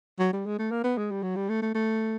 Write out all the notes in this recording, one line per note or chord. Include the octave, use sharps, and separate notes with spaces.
F#3
G3
G#3
A3
A#3
B3
G#3
G3
F#3
G3
A3
A3
A3